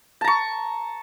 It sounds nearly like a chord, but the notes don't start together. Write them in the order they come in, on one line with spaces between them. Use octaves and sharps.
A5 A#5 C#6